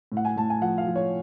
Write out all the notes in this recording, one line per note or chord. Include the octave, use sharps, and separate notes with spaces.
A2
F#5
G#5
A2 A5
G#5
F3 F#5
F5
F3
C#5